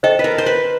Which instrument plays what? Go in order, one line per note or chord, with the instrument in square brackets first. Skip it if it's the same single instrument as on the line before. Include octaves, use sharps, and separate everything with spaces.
[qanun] A4 [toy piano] C5 D#5 G5
[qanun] B4
A#4
C5
B4